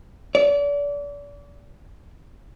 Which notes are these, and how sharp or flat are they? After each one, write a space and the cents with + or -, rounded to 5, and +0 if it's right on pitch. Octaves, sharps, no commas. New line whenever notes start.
D5 -35